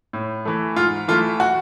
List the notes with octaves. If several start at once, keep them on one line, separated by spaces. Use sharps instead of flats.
A2
E3 A3
G#2 F4
E3 A3 F4
F#4